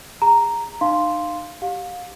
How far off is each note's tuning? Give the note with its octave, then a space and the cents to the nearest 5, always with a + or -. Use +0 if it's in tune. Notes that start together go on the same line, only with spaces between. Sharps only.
G#4 -35 A#5 -5
D#4 -35 F5 +0 C6 -5
G4 -10 F5 +30